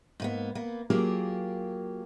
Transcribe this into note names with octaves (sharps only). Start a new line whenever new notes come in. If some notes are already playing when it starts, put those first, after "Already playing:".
G#2 A#3 B3
A#3 B3
F#3 A#3 F4 G4 G#4 A#4